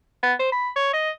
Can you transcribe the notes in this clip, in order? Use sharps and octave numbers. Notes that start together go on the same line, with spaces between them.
B3
C5
B5
C#5
D#5